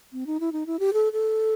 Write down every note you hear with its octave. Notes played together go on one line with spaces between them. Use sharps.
C4
D#4
E4
D#4
E4
G4
A4
A4